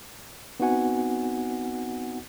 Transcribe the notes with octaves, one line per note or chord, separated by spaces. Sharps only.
B3 C4 D#4 F#4 F#5 G#5